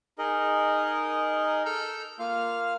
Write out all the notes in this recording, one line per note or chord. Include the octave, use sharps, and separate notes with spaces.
D#4 G#4 A#4 D#5
A4 E6 F6 G6
A#3 F4 F5 F6